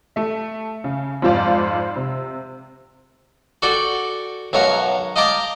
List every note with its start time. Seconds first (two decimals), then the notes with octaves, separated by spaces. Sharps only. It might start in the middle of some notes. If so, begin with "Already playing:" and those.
0.16 A3 E5
0.84 C#3
1.22 F2 G#2 F4 C5 D5 F5
1.96 C3
3.62 F#4 A4 D5 G5
4.53 B1 F#2 F#3 C#5 F5 A#5
5.16 D#5 F5 G5 A5 A#5 D6